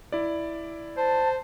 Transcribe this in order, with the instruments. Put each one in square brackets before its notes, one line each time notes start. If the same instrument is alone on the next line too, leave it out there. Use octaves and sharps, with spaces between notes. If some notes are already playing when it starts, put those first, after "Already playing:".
[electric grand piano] E4 D5
[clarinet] C5 [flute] A5